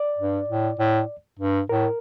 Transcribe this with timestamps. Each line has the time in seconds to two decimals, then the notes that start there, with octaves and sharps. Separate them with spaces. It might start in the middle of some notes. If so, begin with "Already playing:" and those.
Already playing: D5
0.18 G2
0.49 A2
0.80 A2
1.39 G2
1.69 A2 A#4